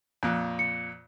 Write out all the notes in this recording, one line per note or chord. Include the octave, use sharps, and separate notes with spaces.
F2 A#2 F#6
C#7